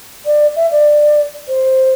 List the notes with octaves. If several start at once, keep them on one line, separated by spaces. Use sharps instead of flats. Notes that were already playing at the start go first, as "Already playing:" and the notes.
D5
E5
D5
C5